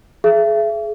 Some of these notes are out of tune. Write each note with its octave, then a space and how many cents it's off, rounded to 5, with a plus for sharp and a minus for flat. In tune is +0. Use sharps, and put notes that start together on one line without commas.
G#4 +35 E5 +35